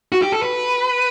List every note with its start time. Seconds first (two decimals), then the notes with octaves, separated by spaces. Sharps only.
0.12 F#4
0.22 G4
0.32 A4
0.42 B4